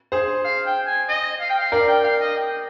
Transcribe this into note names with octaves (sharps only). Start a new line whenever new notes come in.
G#4 C5
F5
G5
G#5
D#5
F5
G5
F5
A#4 D5 F5
G5
F5
D#5
G5